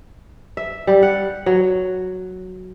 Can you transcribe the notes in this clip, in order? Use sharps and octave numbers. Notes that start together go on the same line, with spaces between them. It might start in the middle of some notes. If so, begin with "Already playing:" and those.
E5
G3
F#5
F#3